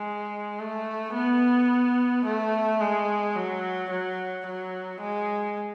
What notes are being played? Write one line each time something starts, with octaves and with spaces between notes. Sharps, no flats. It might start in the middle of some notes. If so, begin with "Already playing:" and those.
Already playing: G#3
A3
B3
A3
G#3
F#3
F#3
F#3
G#3